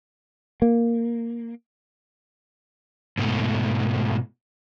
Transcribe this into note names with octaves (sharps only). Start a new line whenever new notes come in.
A#3
G#2 B2 A3